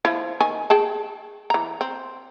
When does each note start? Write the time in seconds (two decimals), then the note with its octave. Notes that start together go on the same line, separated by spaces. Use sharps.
0.05 F3 E4
0.40 D#3 G#5
0.70 G#4 G5 A5
1.50 E3 A#5
1.81 C4